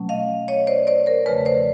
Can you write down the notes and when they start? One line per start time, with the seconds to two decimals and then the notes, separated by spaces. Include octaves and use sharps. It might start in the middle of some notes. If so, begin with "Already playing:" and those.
Already playing: B2 F#3 A3 C#4
0.09 D#5 F5
0.48 C#5 D#5
0.67 C5 D5
0.87 C5 D5
1.06 A#4 C5
1.26 E2 C#3 F3 A3 B4 C#5
1.45 C5 D5